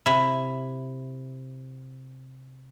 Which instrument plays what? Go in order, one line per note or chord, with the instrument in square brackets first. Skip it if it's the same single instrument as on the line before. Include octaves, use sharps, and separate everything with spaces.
[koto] C3 E4